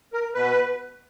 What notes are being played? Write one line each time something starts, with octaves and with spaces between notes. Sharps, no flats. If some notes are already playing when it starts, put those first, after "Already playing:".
A#4
B2 B4